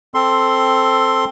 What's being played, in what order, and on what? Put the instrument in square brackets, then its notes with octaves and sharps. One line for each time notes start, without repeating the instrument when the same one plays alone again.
[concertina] C4 A4 C6